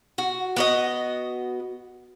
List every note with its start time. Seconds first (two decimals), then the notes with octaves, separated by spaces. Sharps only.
0.18 F#4
0.56 B3 F#4 D#5